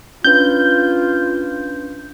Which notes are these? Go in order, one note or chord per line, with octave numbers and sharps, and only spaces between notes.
C#4 D4 F4 B4 G6